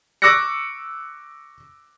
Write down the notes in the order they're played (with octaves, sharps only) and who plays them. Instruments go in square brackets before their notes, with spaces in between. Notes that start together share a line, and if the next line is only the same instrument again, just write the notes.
[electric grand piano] C#6 D6 E6 F#6 A#6 C#7